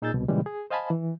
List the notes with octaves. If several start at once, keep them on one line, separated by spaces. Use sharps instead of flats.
A#2 D#4 G#4 E6 G6 A6
C2 B2
A#2 C#3 E3 G3 G#3
G#4
C5 D#5 F5 G#5 A5 B5
E3